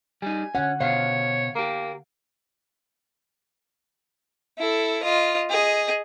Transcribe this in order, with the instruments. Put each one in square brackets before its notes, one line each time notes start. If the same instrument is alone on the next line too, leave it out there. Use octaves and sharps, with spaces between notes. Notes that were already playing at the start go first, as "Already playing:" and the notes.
[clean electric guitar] G3 D#4 [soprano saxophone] G#5
[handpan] D3 F#5 [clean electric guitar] C#4
[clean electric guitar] B2 C5 [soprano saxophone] C#5 [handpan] F5
[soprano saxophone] A#3 [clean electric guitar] G4 A#4
[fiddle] E4 A4
F4 D#5
G#4 D#5